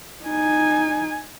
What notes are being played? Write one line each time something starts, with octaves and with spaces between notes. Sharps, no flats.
D#4 G#5